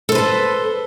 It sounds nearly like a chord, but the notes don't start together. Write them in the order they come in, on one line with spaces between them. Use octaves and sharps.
A4 C5 B4 A5